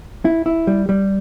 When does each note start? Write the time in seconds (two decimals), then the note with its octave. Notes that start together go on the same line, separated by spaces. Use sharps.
0.25 E4
0.46 E4
0.67 G3
0.89 G3